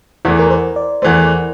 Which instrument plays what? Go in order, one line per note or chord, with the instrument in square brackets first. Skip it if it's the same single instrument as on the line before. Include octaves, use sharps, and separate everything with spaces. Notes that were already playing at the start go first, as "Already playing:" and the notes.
[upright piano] E2 E3 A3 [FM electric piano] E4
[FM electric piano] A#4
C5
D5
[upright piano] E2 E3 A3 [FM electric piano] C5